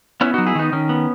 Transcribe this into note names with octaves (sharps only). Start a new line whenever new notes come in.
B3 C#4 E4
F#3 D#4 F#4
E4 G#4
D#3 B3 D#4
D#3 C#4
B3